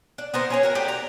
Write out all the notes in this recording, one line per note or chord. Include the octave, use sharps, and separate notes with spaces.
D4
B3 A#4 C5
C#4 G#4 C#5
F#4 A#4
A3 D4 G4
A#5